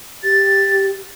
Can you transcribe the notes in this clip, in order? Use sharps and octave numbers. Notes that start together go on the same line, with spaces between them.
G4 A6